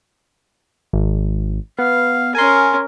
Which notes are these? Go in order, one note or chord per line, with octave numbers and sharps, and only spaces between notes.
G#1
B3 F5
C#4 A#4 G#5 C6